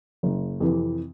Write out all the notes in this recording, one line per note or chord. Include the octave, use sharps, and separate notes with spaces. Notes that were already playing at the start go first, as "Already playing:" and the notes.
F#1
F2 C3 E3